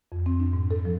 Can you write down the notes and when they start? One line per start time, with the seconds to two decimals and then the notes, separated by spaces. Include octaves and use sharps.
0.12 F2
0.26 C4
0.40 D4
0.53 G#2
0.71 A4
0.85 F3